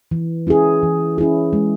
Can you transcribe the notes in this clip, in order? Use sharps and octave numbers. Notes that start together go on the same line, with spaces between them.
E3
C#4 E4 G#4
E3
C#4 E4 G#4
G#3